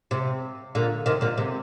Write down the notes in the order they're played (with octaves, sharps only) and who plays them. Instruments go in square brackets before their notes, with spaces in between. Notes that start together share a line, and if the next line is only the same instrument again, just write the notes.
[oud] C3
A#2 D3
C3 D#3
A#2 D3
C3